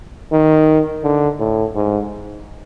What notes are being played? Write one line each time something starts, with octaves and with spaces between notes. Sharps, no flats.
D#3
D3
A2
G#2